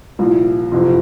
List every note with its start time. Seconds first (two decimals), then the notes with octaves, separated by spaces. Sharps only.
0.19 C2 A#2 F3
0.71 F#1 F2 C3 F3